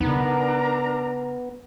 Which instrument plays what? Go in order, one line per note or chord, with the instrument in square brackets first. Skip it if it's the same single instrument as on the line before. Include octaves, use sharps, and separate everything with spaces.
[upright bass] C#3 D#4 [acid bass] B3 [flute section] D4 A#4 A#5